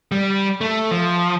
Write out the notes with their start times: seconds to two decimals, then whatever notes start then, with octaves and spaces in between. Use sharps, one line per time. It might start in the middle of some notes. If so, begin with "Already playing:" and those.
0.12 G3
0.61 A3
0.91 F3